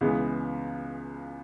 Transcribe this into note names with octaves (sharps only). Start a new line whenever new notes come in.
C#2 C#3 E3 G#3 B3